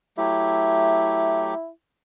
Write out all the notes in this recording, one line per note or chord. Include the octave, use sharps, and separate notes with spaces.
F#3 A3 E4 G4